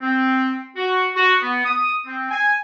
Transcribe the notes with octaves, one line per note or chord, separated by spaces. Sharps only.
C4
F#4
F#4
B3
D#6
C4
G#5